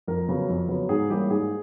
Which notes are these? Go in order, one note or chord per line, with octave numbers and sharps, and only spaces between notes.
F2 A#4
C#3 F#3 B3
F2
C#3 F#3 B3
G#2 G#4
E3 G3 A#3 C#4 G4
G#2 G#4